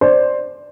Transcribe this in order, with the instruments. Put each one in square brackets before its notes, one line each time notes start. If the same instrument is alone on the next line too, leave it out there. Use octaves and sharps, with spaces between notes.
[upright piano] C5 D5